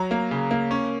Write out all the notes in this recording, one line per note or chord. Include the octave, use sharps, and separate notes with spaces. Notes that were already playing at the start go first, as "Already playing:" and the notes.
Already playing: F#3 A#5
A#3
C#3
A#3
C#4